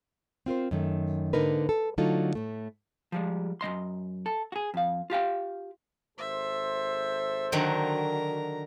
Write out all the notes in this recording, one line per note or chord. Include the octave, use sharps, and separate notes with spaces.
C4 F4 A#4 C5
F#2 D#3 A3
G#2 D3 A#3 D#4 A#4 B4
A4
D3 F#3 A3 D#4 F4 A4
A2 A3
F3 G3 G#3
F#2 F#3 D#5 C6
A4
F#4 G#4
F2 F5
F4 G4 F5 G5
G#1 A4 C5 E5
D3 D#3 F#3 A#4 A#5